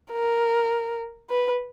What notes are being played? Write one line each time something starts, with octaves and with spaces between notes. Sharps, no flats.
A#4
B4